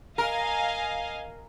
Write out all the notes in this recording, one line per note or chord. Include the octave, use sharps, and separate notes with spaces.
A#4 D#5 F5 G#5